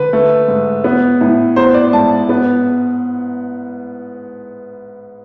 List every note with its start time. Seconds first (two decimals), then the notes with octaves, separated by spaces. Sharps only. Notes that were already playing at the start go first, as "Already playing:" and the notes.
Already playing: D3 B4
0.13 A3
0.48 G#2
0.84 B3
1.21 A2
1.56 B3 C5
1.74 D5
1.93 G#2 A5
2.29 B3